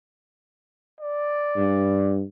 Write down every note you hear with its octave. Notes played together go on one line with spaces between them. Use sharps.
D5
G2